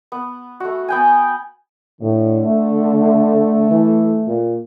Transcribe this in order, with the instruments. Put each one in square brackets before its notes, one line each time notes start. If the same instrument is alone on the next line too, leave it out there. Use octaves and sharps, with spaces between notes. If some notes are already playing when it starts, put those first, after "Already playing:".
[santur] B3
A3 F#4
B3 G5 G#5
[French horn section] A2 [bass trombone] D3
[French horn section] A3
[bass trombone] E3
A#2